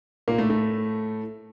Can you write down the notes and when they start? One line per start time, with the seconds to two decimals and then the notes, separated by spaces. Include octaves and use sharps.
0.28 A#2 A#3
0.38 A2 A3
0.50 A2 A3